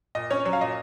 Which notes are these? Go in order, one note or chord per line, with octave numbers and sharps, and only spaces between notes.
A#2 D#5
C#4 C#5
F#3 C#5
F5
A#2 D#5